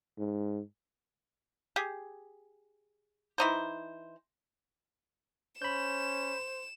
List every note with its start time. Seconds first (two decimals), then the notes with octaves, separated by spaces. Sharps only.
0.18 G#2
1.76 G4 G#4
3.38 E3 D#4 C5
5.62 C#4 C5 B5 G6 E7